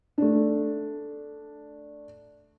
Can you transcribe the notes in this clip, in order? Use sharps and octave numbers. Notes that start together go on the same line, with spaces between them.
A3 D4